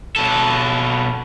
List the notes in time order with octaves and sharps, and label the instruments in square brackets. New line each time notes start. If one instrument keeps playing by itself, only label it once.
[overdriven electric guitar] B2 A4